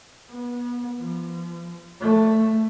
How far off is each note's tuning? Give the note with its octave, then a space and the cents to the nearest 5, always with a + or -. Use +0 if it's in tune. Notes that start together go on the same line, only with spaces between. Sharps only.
B3 -25
F3 -35
A3 +5